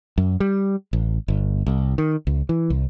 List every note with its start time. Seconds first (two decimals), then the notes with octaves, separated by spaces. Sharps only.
0.18 F#2
0.40 G3
0.93 A1
1.28 G1
1.66 C2
1.98 D#3
2.27 C#2
2.49 E3
2.70 C2